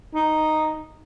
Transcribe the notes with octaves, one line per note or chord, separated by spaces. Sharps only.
D#4